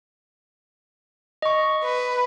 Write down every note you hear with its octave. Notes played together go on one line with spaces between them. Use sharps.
D#5 C#6
B4